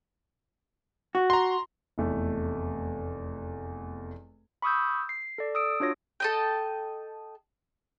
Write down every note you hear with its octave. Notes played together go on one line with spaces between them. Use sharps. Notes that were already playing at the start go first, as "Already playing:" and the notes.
F#4
A#5 C6
F1 E2 A3
B5 C#6 D#6 E6 G6
C7
A4 D5
D#6 E6 D7
D4 F4 F#4 C#5 A#6
A4 D#5 G5